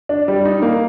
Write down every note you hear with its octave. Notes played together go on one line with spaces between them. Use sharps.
D4
G3
D#4
A#3